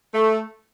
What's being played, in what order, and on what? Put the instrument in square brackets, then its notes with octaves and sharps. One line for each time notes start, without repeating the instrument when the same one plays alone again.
[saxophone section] A3